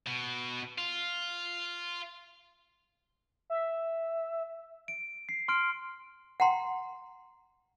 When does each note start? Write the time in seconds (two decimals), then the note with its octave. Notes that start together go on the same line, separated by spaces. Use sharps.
0.07 B2
0.78 F4
3.50 E5
4.88 D7
5.29 C7
5.48 C6 F6 D7
6.40 F#5 G5 A#5 C6